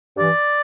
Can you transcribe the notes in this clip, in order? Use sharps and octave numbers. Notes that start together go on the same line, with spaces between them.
G2 E3 D5